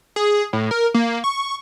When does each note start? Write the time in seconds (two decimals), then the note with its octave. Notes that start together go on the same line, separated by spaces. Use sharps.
0.16 G#4
0.53 A2
0.71 A#4
0.94 A#3
1.24 C#6